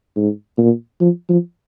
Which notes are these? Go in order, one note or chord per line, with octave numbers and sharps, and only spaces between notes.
G#2
A#2
F3
F3